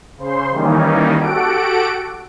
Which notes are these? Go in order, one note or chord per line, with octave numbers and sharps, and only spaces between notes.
C#3 C5 C6
D#3 E3 G3 A#3 C#4 D#4
F#4 G4 A4 F#5 D7